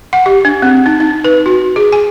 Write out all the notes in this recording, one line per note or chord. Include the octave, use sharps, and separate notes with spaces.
F#5
G4
D4
C4
D#4
D#4
B4
F#4
G#4
G#5